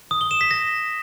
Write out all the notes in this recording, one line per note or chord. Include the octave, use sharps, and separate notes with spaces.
D#6
G7
E7
B6
A#6